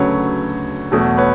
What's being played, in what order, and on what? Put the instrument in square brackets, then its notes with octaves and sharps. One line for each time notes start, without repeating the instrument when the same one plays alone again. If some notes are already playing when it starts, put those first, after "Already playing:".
Already playing: [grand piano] D2 C#3 F#3 A3 B4 C#5
E2 B2 F#3 A3
B4 C#5